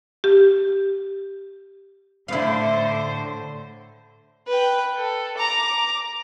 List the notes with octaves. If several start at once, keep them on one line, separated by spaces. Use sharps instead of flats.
G4
A2 D3 E4 C5 F5
B4 G5
A4
A#5 D6